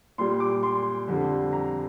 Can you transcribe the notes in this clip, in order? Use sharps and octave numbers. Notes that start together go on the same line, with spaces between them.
A#2 G3 C6
D6
C6
F2 D3 G3
A#5